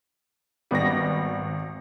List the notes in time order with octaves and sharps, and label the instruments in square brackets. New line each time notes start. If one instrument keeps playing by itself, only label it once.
[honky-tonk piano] G#1 A#6 [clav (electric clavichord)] G3 B3 F#4